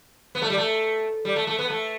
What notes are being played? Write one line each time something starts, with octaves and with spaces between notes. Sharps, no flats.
B3
A3
G3
A3
G3
A3
A3
B3
A3